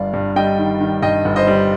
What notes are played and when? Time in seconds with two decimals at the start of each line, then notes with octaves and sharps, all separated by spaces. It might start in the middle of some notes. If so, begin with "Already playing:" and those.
Already playing: G1 G2 D5 F5
0.14 G2
0.36 G3 D#5 G5
0.59 D#3
0.81 D#3
1.02 G2 D#5 G5
1.25 G1
1.36 C5 D#5
1.47 G3